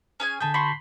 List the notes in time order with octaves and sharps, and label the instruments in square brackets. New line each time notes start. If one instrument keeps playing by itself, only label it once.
[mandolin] C#4 G#4 G#5
[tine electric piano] D3 A5 G6 [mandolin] G#4 B5
[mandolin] F#4 [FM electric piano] B5 C6